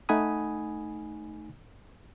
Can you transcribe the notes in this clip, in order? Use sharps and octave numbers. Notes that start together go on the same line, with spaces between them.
A3 D#4 F#5 G#5 B5 D#6